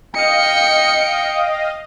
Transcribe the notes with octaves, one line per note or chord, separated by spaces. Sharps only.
D#5 F5 G5 C#7